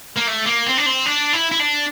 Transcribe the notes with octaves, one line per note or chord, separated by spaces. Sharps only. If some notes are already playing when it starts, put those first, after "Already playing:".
A#3
A3
A#3
C4
D4
C4
D4
E4
E4
D4